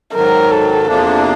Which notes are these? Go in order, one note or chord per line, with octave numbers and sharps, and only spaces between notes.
G#2 D#3 F#3 A#4
A4
E2 C3 F3 A#3 D4